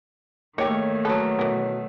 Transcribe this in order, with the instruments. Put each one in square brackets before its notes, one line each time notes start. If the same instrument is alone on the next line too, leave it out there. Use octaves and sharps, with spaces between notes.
[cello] D#3 A3 [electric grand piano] A#3 [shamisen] D#4 G4 [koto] C#5
[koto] F#3 B3 [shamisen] A4
[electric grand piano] B2 [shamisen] E3 A#4